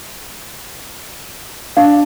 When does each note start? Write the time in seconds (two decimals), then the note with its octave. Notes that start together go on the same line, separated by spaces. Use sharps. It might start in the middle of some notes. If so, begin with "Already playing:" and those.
1.77 D4 F5